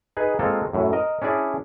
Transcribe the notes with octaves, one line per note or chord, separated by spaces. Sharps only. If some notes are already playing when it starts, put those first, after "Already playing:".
D#4 G#4 B4
G#3 A#3 C4 F4 A4
F#2 A2
A#4 D#5
C#4 D4 E4 G#4 D5